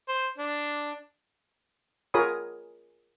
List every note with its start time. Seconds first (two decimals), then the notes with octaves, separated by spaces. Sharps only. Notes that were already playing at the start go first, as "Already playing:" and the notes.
0.09 C5
0.38 D4
2.14 F4 G#4 A#4 C#5 B5 D#6